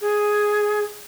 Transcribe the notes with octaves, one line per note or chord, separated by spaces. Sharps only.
G#4